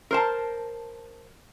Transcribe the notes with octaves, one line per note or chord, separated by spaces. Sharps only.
A#4 C5 A5